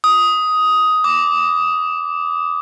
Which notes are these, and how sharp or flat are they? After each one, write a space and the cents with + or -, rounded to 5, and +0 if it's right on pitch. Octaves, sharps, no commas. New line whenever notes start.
D#6 +10
D6 -10